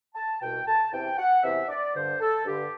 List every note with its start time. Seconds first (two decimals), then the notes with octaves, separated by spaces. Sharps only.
0.15 A5
0.41 C2 B2 G5
0.66 A5
0.91 E2 C3 E3 G5
1.18 F#5
1.43 E2 C3 E3 E5
1.69 D5
1.94 G2 D3 C5
2.20 A4
2.45 G2 D3 G4